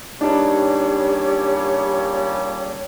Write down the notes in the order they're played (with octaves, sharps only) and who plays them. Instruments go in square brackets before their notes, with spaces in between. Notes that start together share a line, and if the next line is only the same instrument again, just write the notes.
[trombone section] A#2 C#3 G3 [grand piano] D4 D#4 [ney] G4 [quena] C#5